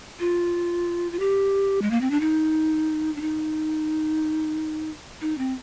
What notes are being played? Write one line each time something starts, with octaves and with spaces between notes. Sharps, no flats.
F4
F4
G4
G#3
A#3
C4
D4
D#4
D4
D#4
D#4
C4